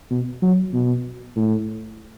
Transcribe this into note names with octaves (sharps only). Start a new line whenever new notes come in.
B2
F#3
B2
A2